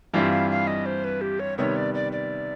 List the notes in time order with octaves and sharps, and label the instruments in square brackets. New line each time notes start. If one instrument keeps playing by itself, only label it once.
[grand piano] G2 E3 G3 C4 F4 [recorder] F5
[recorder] F5
F5
D#5
C5
B4
G4
C#5
[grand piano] C3 D#3 G3 B3 [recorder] C#5
[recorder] D5
D5
D5